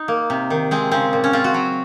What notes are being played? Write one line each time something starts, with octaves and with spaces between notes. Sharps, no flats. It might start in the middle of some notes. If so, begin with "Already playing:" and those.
Already playing: D#4
A#3
C3
D#3
G#3 C4
C#3 C4
A#2
C#4
C4 F4
F#4
F#3